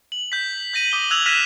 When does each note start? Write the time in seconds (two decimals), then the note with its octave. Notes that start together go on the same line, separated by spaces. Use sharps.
0.12 F#7
0.32 G6 B6
0.74 G6 A#6 D#7 F#7
0.92 D6 D#6 F#7 G7
1.11 E6 F#6 G#6 F7 F#7
1.26 F6 F#6 A#6 B6 D#7 E7